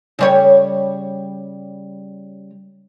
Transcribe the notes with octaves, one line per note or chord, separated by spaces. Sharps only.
C#3 G3 C#5